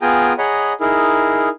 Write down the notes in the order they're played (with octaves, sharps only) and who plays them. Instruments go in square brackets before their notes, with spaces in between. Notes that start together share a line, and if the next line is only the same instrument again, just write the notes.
[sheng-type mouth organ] B3 F4 G#4 G5 G#5 A#5
G#4 C#5 D#5 F#5 A#5 B5
D#4 E4 G#4 A#4